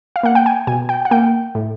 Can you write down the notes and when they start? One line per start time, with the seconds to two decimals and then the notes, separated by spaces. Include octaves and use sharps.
0.16 F5
0.23 A#3 F#5
0.35 G5
0.46 G#5
0.67 B2 G#5
0.89 G5
1.05 F#5
1.11 A#3 G5
1.55 A2